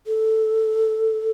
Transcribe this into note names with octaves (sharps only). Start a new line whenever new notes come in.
A4